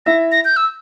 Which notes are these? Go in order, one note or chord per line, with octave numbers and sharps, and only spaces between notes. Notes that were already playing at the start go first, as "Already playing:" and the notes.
E4 E5 A#6
A#6
G6
E6